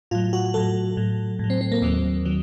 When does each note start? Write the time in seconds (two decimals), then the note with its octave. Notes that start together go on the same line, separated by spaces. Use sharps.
0.11 A2 F#3 F4
0.33 F#4
0.54 A2 F#3 A4
0.97 A2 F#3
1.39 A2 F#3
1.50 C4
1.61 C4
1.72 A#3
1.82 D#2 D#3 F#3 C4
2.25 D#3 F#3